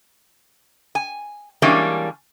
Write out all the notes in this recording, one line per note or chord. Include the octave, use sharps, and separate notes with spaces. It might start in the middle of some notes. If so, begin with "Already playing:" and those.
G#5
E3 G3 G#3 A#3 C#4 D4